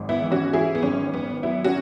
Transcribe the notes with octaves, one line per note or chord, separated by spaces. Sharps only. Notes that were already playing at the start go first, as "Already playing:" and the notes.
Already playing: G#1 G#2
B3 E4
E3
C#4 F#4
E3 E4 G#4
B3
G#1 C#4
G#1 B3
F#3 B3 E4
C#4 F#4